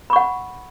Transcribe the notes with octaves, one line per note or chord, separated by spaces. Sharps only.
F#5 B5 C#6